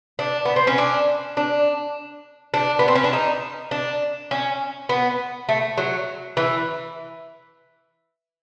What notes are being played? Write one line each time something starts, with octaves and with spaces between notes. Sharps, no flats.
D4
B3
C4
C#4
D4
D4
D4
B3
C4
C#4
D4
D#4
D4
C#4
B3
A3
F#3
E3